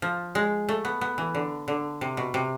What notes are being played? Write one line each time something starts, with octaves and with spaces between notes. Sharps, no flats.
F3
G#3
A3
B3
B3
E3
D3
D3
C3
B2
C3